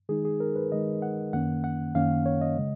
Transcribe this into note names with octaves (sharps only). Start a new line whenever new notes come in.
D#3 G#3 D#4 G#4
G#4
A#4
B4
D#3 G#3 D#4 D#5
F#5
F#2 D#3 A#3 C#4 F#5
F#5
F#2 D#3 A#3 C#4 F5
C#5
D#5
C#3 G#3